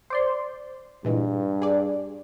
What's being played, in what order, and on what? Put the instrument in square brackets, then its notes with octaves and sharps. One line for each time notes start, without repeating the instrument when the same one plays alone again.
[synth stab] C5 D5 C6
[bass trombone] G2 [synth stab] A#2 E3 G#3
[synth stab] G#4 D5